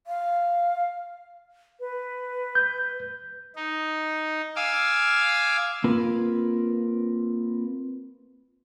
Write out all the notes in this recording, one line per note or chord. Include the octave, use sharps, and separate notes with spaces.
F5
B4
G6
D#4
F5 G#5 D6 E6
A#3 C4 F4 A#4 B4